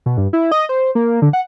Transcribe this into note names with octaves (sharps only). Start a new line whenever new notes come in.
B2
G2
E4
D#5
C5
A#3
D3
F#5